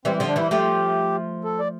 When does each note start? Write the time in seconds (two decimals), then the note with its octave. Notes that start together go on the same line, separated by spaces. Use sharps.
0.05 E3 G3 C4
0.17 C4
0.20 D3 F3
0.28 D4
0.36 E3 G3 E4
0.51 F3 A3 G4
1.44 A4
1.60 D5